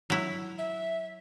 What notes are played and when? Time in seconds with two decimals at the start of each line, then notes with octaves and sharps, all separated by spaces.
0.10 F#3 E4
0.58 E5